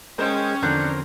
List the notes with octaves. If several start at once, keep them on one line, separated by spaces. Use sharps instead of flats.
G#3 C#4 A#4 C5 D#5 G5 C6
E2 D3 F3 C4 D4 A#4 F#5 G6